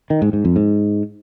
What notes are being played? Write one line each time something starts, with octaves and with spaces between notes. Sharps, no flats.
D#3
G#2
G#2
F2
G#2